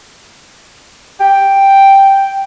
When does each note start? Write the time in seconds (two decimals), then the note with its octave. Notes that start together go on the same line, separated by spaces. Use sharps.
1.20 G5